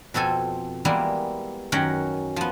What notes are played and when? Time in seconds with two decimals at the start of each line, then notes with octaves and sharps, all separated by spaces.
0.14 F2 B2 C4 A4 G#5
0.85 E3 G3 G#3 A#3 B3 E4
1.72 F#2 D#3 C#4 F#4 F#5 G5
2.36 F3 B3